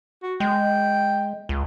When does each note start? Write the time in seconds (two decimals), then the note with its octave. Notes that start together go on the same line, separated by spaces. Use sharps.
0.23 F#4
0.40 G#3 G5
1.49 C#2